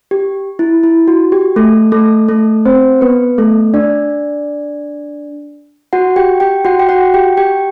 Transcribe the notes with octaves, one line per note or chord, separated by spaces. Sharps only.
G4
E4
E4
F#4
G4
A3 A4
A3 A4
A3 A4
C4 C5
B3 B4
A3 A4
D4 D5
F#4 F#5
G4 G5
G4 G5
F#4 F#5
G5
F#4 F#5
G4 G5
G4 G5